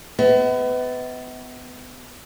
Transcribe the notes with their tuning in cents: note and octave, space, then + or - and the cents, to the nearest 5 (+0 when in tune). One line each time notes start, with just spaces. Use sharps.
B3 +25 E5 -45